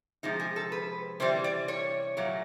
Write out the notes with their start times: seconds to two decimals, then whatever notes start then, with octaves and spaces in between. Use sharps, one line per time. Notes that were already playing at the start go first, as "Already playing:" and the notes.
0.23 C3 F3 G#3 D#4
0.40 G#4
0.56 A4
0.72 B4
1.20 C3 E3 G3 C5
1.44 D5
1.68 C#5
2.17 A#2 F#3 A3